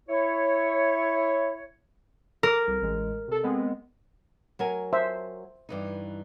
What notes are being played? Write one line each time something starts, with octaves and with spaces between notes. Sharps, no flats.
E4 C#5
A#4 A#5 D6
C2
A1 G#3
C3 A4
G#3 B3 C4
F#3 A#4 G#5
C5 E5
G2 E3 D#4